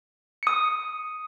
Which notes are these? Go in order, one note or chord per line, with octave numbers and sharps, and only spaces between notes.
D#6 C#7